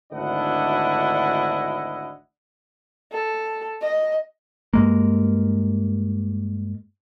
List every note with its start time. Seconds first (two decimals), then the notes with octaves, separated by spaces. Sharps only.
0.11 G#1 D2 D4 E4 D#5 F#5
3.12 A4
3.82 D#5
4.74 G2 G#3 A#3